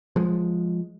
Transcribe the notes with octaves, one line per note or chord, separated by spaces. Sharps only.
F3 G#3